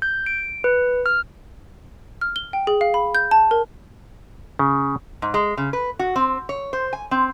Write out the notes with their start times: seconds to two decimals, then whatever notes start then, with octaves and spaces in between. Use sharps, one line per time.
0.02 G6
0.26 D7
0.64 B4
1.06 F6
2.21 F6
2.36 G7
2.53 G5
2.67 G#4
2.81 F5
2.94 B5
3.15 G6
3.31 A5
3.51 A#4
4.59 C#3
5.22 G#2
5.34 G#3
5.57 C#3
5.73 B4
5.99 F#4
6.16 C4
6.49 C#5
6.73 C5
6.93 G#5
7.11 C4